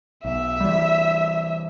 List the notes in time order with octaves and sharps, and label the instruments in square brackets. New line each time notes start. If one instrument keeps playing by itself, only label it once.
[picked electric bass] B1 [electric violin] E5
[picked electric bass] E3 G3